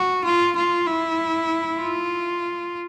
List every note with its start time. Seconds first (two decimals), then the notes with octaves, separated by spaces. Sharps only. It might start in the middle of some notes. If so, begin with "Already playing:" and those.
Already playing: F#4
0.24 F4
0.56 F4
0.87 E4
1.80 F4